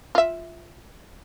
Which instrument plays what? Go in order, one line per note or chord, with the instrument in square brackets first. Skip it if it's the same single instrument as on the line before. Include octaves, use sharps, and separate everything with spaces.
[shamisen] F4 E5